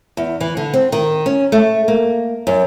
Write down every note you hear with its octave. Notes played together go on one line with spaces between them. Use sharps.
E2
E3
D3
C4
D#3
C#4
A3
A#3
F#2